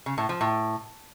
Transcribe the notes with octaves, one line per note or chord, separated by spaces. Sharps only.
C#3
A2
F3
A2